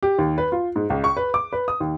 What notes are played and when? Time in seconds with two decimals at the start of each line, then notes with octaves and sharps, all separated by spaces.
0.03 G4
0.18 D#2
0.38 B4
0.52 F4
0.76 G#2
0.90 C#2
1.04 C#6
1.17 B4
1.34 D6
1.53 B4
1.68 D#6
1.80 D#2